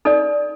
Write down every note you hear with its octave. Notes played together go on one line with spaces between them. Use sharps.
D#4 A4 D5